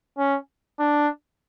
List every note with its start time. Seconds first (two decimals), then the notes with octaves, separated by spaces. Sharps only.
0.18 C#4
0.80 D4